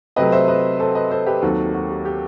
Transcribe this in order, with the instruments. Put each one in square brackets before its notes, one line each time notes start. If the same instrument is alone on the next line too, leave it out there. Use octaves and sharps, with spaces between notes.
[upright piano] C3 F#3 A3 C4 B4 D#5
C5 E5
B4 D#5
A4 C5
B4 D#5
A4 C5
G4 B4
D#2 D#3 F#3 C4 F#4 A4
F#4
G4
G4